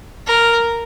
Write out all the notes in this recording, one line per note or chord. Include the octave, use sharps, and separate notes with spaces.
A#4